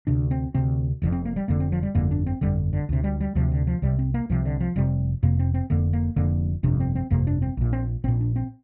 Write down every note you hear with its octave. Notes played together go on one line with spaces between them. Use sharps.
D2 C3 D4
C4
D2 C3 C4
F1 F2 D3
C4
A#3
G3
F1 F2 D3 A#3
C4
F3
G3
G1 F2 D3 A#3
D4
C4
G1 F2 D3 G3
D3
D2 C3
G3
G3
D2 C3 F3
D3
F3
C2 C3 G3
C4
A#3
C2 C3 F3
D3
F3
F1 F2 C3 G3
F1 F2 C3 A#3
C4
C4
F1 F2 D3 A#3
A#3
F1 F2 D3 A#3
G1 F2 C3 D4
C4
C4
G1 F2 C3 A#3
D4
C4
A#1 A#2
C4
A#1 A#2 C4
D4
C4